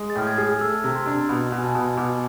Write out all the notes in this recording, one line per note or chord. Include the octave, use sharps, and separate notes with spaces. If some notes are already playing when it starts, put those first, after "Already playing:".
Already playing: G#3
A6
A2 F6
G#6
G#4
A3 E6
C3
C6
D4
B2 B5
B5
B2
G#5
A5
B2
B5
B2 D6